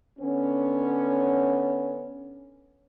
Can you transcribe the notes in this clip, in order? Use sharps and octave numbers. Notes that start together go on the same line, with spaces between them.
D3 B3 C#4